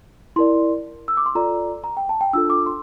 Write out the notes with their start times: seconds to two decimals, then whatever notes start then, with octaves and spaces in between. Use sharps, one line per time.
0.36 E4 A#4 D5 C6
1.08 E6
1.17 D6
1.26 C6
1.35 F4 A4 D5 A#5
1.84 A#5
1.97 G5
2.09 A5
2.21 G5
2.33 D4 F4 A4 E6
2.50 D6
2.66 C6